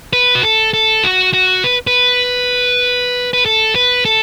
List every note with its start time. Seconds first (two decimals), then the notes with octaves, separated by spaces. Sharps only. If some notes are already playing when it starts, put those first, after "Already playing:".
0.13 B4
0.35 F#4
0.43 A4
0.74 A4
1.04 F#4
1.34 F#4
1.64 B4
1.87 B4
3.33 B4
3.45 A4
3.75 B4
4.05 A4